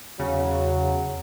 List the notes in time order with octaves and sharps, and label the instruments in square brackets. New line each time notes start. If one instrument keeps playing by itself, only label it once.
[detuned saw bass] E2 [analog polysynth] C#3 [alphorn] F#3